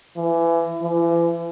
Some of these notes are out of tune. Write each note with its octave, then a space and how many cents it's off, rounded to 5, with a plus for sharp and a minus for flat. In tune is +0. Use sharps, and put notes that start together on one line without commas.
E3 +25
E3 +40